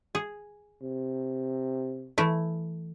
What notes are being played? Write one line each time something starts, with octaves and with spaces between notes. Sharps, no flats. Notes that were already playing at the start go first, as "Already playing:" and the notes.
G#4
C3
E3 A3 E4